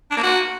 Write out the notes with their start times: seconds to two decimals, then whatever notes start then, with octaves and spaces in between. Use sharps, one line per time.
0.11 D4
0.17 A#3
0.23 F#4